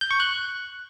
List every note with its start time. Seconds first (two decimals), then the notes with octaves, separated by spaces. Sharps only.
0.01 G6
0.11 C#6
0.20 F#6